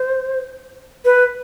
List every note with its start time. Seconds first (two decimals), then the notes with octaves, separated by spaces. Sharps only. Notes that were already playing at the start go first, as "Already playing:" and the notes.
Already playing: C5
1.05 B4